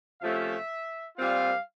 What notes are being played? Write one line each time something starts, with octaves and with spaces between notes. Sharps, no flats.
C3 F3 A3 C#4 F4 E5
A#2 G3 C4 F4 F5